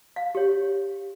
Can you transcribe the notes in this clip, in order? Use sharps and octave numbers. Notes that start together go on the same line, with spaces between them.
F5
G4 C#5